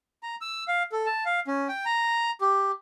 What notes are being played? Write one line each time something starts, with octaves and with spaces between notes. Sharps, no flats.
A#5
E6
F5
A4
A5
F5
C#4
G5
A#5
G4